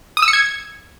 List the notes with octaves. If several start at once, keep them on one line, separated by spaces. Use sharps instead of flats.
D#6
E6
C#7
G#6